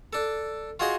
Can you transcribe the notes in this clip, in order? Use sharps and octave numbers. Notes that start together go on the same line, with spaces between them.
D4 A4
F4 F#4 G#4 D#5 C6